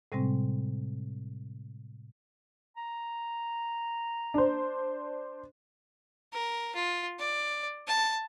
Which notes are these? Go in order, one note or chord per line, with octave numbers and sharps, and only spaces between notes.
A2 C3 G3 G#3 C4
A#5
D4 C5
A#4
F4
D5
A5